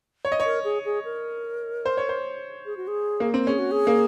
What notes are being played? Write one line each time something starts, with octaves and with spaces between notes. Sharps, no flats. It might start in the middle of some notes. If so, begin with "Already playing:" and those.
C#5
D#5
C#5
A#4
G#4
G#4
A#4
C5
C#5
C5
G#4
F#4
G#4
A#3
C4
C#4 G#4
F#4
G#4
A#3